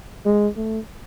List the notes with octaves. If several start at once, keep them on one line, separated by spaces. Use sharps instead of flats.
G#3
A3